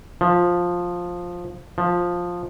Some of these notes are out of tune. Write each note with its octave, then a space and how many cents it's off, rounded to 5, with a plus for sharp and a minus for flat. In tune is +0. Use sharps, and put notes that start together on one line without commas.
F3 +10
F3 +10